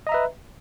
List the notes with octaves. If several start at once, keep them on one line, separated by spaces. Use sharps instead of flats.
B4 D#5 E5 A#5